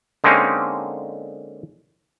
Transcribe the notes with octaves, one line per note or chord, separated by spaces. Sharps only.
D3 G#3 A#3 C4 C#4 D#4